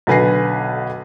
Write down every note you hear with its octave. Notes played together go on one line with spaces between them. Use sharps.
B1 D3 B4 G#5 A#6 C7